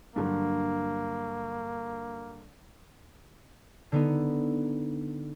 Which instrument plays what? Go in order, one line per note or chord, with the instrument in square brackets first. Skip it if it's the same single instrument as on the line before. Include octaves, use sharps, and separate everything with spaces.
[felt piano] G2 D3 F#3 [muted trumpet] A#3
[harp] D3 B3 D#4